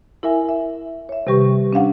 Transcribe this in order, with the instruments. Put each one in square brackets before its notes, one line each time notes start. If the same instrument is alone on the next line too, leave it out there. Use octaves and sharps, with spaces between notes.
[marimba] E4 A#4 E5 G#5
E5
C#5 E5
C3 D#3 G3 G4 B4 C#6
C#4 D4 F5 F#5